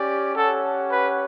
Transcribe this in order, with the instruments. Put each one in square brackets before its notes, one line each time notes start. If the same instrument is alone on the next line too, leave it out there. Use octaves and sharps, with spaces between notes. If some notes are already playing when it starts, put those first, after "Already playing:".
Already playing: [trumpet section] C#4 G4 D5
[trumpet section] C#4 G4 C#5 F#5 [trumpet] A4
[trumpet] B4